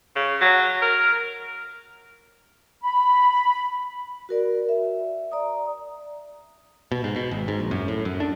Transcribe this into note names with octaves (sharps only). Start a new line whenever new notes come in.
C#3
F#3
A#4
B5
F#4 A#4 D5
E5
D5 A#5 D#6
B2
G#2
B2
G#1
G#2
A#1
F#2
A2
F#2
D4